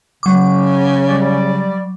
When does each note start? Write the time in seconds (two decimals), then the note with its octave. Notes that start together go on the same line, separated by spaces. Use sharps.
0.23 C#3 F#3 D6
1.08 G3 D5